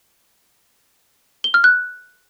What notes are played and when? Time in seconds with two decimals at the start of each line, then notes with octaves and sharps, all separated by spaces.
1.44 G7
1.54 F6
1.64 F#6